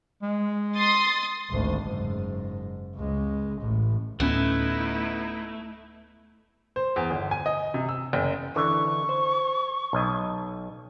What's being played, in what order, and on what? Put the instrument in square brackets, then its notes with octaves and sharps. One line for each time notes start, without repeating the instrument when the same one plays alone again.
[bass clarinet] G#3
[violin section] C6 D#6 A6
[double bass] G#1 D2
F#1 G#2
C#2 G#3
A1 A2
[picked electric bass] D1 C#4 [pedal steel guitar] A3 [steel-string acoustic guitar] B3 [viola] D#4 E4
[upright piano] C5
E2
G1
G#5
D#5
C3
E6
F#1
[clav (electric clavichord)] D3 E3 [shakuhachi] C#6
[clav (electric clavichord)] C5
B1 D#5